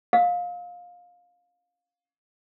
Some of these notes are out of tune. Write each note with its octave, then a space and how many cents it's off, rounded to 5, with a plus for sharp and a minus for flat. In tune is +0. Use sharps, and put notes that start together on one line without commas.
F5 +20 E6 -45